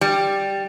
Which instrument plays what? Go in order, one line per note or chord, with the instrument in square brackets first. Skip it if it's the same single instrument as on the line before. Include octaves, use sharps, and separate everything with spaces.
[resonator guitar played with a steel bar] G3